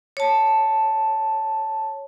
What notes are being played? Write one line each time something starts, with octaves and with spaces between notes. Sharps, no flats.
C#5 A5